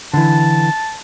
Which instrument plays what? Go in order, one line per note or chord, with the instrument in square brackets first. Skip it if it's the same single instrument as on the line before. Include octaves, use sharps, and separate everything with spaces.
[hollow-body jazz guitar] D3 E3 [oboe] A5